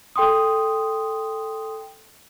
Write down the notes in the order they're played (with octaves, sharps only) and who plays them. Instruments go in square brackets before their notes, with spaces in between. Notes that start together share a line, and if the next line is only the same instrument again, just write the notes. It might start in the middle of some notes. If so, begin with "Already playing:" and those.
[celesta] A4 G5 C6 D#6